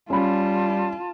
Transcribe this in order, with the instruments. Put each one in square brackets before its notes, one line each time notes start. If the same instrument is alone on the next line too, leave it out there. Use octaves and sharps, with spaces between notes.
[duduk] G3 [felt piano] C#4 B5 [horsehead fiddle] F4 A5